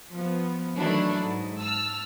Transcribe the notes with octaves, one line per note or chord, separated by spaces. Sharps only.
F3 B3
D#3 E3 F#3 A3 D4 E4
G#2
A5 E6 F6